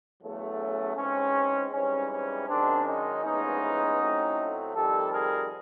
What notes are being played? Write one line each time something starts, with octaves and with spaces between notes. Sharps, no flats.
E2 C#3 F#3 A3
C#4
G#2 E3 G#3 C4 C#4
G#2 E3 G3 C4 C#4
C#4
F#2 D#3 G#3 C4 D4
C#4 D#4
A#1 A2 E3 G#3 B3 C#4 D#4
A2 F#3 A3 C4
F2 C3 D#3 G3 G4 A4
G#4 A#4